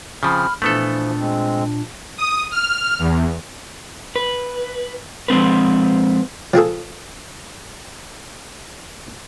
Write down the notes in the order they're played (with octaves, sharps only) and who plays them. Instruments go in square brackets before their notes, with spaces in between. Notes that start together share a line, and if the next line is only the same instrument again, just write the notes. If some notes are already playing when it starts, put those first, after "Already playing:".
[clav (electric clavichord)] C#3 F3 [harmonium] C4 [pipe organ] B5 F6
[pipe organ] A#2 D4 [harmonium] E3 F3 [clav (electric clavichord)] A3 B3 A4
[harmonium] G#3 C4
[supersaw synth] D#6
F6
E2
[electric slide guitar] B4
F3 G#3 C4 B4
[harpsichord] F3 C4 G#4 A4